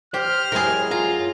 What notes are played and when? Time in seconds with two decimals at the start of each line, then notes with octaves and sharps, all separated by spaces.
0.14 G4 C5 F6
0.52 F#2 G#3 E4 G#4 A#4
0.91 F4 A#5